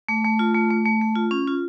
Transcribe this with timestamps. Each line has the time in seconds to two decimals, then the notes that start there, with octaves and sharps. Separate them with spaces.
0.09 A3
0.25 A3
0.39 F4
0.54 A3
0.70 A3
0.86 A3
1.01 A3
1.16 F4
1.31 C#4
1.48 F4